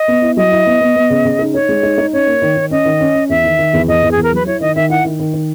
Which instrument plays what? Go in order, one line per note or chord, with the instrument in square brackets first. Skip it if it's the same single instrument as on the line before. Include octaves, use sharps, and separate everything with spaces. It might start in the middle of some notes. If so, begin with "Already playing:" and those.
Already playing: [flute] D#5
[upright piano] B3
E4
[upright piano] F#3 [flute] D#5
[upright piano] E4
B3
B3
B3
C#3
C#3
D#4
[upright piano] D#4 [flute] C#5
[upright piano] G#3
D#4
D#4
[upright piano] C#4 [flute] C#5
[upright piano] A#3
D#3
D#3
[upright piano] C#4 [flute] D#5
[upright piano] D#3
C#4
C#4
[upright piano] E2 [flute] E5
[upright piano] D#3
D#3
E2
[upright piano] E2 [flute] D#5
[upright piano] E2
[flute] G#4
[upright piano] E2
[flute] A#4
[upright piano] F#3 [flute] B4
[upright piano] E4 [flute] C#5
[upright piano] D#3 [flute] D#5
[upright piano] D#3 [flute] E5
[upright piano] E4 [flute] F#5
[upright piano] D#3
D#3
D#3